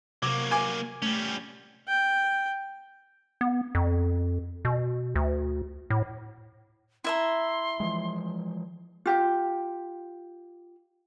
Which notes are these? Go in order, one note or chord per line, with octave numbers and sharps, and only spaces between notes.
C3 F#3 A#3 D6
G#5 D6
G3 A3 C#4
G5
B3
F2
B2
D2
A2
E4 E5 A#5 C6
E3 F3 G#3
F4 G4